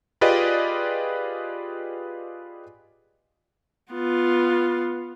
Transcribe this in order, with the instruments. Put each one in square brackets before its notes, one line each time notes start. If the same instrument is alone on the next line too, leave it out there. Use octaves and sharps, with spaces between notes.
[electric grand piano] F4 G4 G#4 B4 D5 D#5
[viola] B3 F4